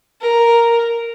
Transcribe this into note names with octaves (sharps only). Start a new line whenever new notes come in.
A#4